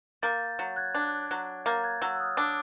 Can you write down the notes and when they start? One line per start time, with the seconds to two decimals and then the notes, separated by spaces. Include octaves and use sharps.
0.22 A#3 G6 A6
0.59 F#3
0.76 F#6 G#6
0.95 D4
1.31 F#3
1.66 A#3 G6 A6
1.84 F#6 G#6
2.02 F#3 E6 F#6
2.15 E6
2.20 D#6 F6
2.37 D4 D6 E6